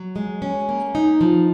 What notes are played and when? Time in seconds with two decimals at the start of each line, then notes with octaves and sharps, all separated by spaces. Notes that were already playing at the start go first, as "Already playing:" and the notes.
Already playing: F#3
0.16 G#3
0.42 C#4
0.69 A#3
0.95 D#4
1.21 F3